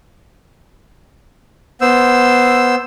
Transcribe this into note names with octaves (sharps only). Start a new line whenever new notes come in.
B3 C5 E6